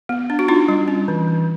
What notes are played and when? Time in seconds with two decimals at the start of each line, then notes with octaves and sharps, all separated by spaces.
0.09 B3
0.30 D4
0.39 F#4
0.48 D4 D#4 F4
0.68 G3
0.88 C#4
1.08 E3
1.28 E3